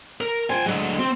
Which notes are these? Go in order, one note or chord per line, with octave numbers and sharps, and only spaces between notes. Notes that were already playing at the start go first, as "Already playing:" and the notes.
A#4
F4 C5 G5 G#5
D3 F#3 G#3
C4